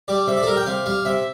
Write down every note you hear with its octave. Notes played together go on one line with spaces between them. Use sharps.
G3 D5
C3 E5
D5
A4
G3 A#4
G5
C3 F5
G3 F5
C3 E5